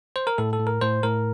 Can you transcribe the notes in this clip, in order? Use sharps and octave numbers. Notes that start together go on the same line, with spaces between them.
C5
A#4
A2 A4
A4
A2
A#4
A2 C5
A2 A#4